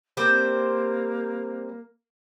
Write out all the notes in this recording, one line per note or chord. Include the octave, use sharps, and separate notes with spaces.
G3 A#3 C4 C5